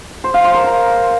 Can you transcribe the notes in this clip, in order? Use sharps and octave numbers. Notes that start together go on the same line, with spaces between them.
C5
F5
C5
A#4
A#5